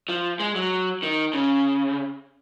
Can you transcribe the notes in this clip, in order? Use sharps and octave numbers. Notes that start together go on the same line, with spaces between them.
F3
G#3
F#3
D#3
C#3